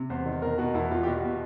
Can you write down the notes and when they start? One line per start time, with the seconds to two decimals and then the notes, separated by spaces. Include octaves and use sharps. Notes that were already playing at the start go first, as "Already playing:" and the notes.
Already playing: C3
0.10 E2 C5
0.26 D#3
0.42 B2 A#4
0.58 B2 F#4
0.74 E2 E4
0.91 E2 F4
1.03 G4
1.07 B2 F#4
1.24 B2